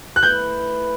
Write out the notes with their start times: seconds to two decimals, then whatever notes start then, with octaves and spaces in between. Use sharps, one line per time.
0.16 F#6
0.23 A3 E4 B4 G6